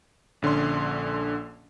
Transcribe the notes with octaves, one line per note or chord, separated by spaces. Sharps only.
A#1 D3 C#4 C6